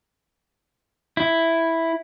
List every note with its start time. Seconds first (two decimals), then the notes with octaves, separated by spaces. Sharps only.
1.17 E4